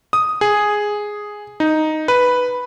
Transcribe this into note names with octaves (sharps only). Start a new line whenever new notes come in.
D#6
G#4
D#4
B4